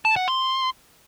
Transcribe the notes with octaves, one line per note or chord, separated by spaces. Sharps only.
A5
F#5
C6